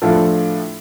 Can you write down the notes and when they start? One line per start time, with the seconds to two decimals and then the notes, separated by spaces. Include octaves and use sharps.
0.02 A2 F3 D4 F4 A4